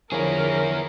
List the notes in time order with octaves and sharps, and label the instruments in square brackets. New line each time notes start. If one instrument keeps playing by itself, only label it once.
[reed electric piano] D3 F3 C#5 [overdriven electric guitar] E4 G#4 [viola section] A#4